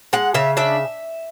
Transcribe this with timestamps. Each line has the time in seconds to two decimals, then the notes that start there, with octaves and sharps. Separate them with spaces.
0.13 G#3 F#5
0.34 C#3 E5
0.57 D4 E5